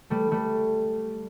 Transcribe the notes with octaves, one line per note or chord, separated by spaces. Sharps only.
G3 A3
G3 A3